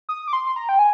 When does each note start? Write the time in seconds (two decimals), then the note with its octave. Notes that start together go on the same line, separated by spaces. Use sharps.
0.09 D#6
0.28 D6
0.33 C6
0.47 C6
0.56 A#5
0.69 G5
0.79 G#5